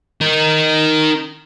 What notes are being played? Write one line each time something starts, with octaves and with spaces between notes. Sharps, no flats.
D#4 A#4